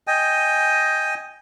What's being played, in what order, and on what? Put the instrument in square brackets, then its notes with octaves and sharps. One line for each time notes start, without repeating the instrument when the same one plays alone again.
[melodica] D#5 G5 G#5